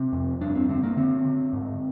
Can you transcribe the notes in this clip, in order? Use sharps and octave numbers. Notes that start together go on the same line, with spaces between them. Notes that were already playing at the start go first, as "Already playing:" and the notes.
Already playing: C3 C4
F2
G2 D4
C4
D3 C4
A#3
D3 C4
D3
G#2